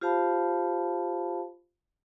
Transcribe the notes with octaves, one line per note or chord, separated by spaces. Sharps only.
F4 G4 C5 F5 A5 B5